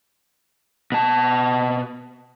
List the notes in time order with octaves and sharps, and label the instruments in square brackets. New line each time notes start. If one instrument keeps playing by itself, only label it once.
[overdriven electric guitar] B2 A5